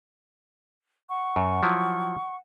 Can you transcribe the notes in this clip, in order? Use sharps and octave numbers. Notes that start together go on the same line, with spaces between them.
F#5 C#6
F#2
F3 F#3 E4